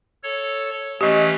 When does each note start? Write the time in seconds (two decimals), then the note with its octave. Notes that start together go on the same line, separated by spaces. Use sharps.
0.23 A4 C#5
1.01 E3 A3 C#4 G4 D#5